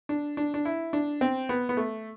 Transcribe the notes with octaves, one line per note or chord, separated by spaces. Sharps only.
D4
D4
D4
E4
D4
C4
B3
B3
A3